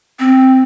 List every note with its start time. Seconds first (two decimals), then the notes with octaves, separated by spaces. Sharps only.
0.19 C4